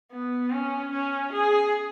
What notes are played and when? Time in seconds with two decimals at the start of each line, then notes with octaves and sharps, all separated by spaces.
0.12 B3
0.51 C#4
0.91 C#4
1.33 G#4